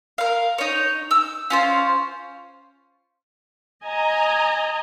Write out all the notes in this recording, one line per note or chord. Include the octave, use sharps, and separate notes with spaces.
A#4 F5
D#4 C#5
E6
C#4 F4 C5
D#5 G#5 A#5